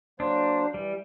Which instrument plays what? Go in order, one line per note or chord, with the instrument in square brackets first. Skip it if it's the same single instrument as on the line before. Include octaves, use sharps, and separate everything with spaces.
[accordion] F#3 A#3 C5 [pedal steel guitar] D4
[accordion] E3 [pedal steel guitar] G3